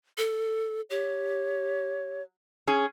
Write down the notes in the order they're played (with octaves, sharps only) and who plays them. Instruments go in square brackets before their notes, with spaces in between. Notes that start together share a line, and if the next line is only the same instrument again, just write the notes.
[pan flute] A4
[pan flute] G4 [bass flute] C#5
[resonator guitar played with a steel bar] C#4 G#4